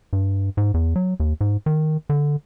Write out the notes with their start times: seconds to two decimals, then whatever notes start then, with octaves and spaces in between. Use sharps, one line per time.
0.13 G2
0.57 G#2
0.74 E2
0.96 F#3
1.20 D#2
1.41 G#2
1.66 D#3
2.10 D3